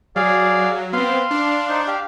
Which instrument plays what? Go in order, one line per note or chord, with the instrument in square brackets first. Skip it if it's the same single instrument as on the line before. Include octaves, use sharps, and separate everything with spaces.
[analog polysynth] F#3 [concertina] G#4 D5 F5
[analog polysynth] B3 C4 [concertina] F5 C6
[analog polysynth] D4
[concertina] D#4 C5
G4 F5